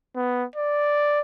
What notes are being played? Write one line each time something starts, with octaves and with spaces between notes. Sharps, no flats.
B3
D5